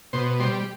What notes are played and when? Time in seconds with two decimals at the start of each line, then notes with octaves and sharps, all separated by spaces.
0.13 B2 C5
0.40 G3 C5